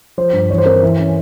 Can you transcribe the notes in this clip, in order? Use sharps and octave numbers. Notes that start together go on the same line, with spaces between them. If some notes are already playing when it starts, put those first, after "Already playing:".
F3 C5
G2
E3 C#5
C5
C4 A#4
E3
C#4